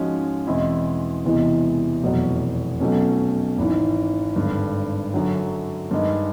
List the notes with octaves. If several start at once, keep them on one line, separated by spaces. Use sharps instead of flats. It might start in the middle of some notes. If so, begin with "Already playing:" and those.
Already playing: G#2 F3 G#3 C#4 F#4
E2 B2 G#3 C4 E4
E1 E2 C3 E3 G#3
F1 E2 B2 F#3
B1 B2 F#3 A3 C#4
G#1 G#2 E3
G#1 G2 D3
F#2 D3 F#3
G2 D#3 G#3